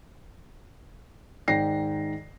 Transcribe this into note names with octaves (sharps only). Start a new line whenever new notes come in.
G#2 D#3 D5 G5 A#6 C7